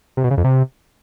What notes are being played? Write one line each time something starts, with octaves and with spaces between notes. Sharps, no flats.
C3
B2
C#3
F2
C3